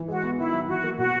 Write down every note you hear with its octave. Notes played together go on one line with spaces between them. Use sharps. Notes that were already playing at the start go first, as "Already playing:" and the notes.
Already playing: E3
G#3 F#4
B3
D#3 E4
F#3
E3 F#4
A#3
B2 F#4